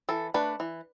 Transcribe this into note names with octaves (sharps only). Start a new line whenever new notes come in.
E3 A4
A3 D4 B4
E3